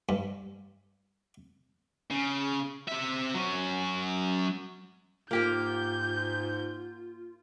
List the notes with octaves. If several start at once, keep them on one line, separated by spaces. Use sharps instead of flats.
G2
C#3
C4 E5
F#3 C#4
G#2 A#3 F4 G4 A#4 G6